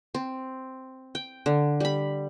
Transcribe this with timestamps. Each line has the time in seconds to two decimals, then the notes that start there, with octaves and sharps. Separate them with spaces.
0.14 C4
1.15 G5
1.46 D3
1.80 G3 B5